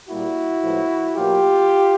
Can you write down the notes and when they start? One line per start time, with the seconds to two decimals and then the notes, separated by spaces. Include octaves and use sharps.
0.09 A#2 G3 A#3 E4 F#4
0.63 A2 F3 G#3 B3
1.16 B2 F#3 A#3 F4 G4